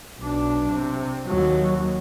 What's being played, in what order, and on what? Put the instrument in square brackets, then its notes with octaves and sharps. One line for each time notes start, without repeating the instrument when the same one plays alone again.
[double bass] B1 D4
C3
D#2 F#3